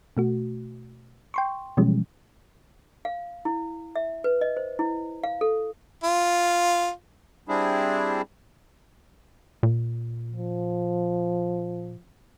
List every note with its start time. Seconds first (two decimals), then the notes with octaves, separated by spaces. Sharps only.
0.17 B2 A3 F#4
1.34 G5 C6 C#6
1.77 B2 E3 F3 G3 G#3 C#4
3.05 F5
3.45 E4
3.96 E5
4.24 B4
4.41 D#5
4.57 C5
4.79 E4
5.24 F5
5.41 A4
6.03 F4
7.49 G3 C4 D4 E4 G#4
9.63 A#2
10.32 F3